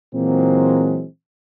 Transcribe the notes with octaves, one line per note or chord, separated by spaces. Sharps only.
A#2 E3 F#3 G#3 A#3 C4